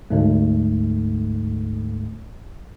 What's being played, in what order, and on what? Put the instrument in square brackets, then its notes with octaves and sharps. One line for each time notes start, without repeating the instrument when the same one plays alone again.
[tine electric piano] D2 G#2 A3